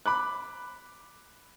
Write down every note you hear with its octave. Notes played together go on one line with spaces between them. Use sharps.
B5 D6 F#6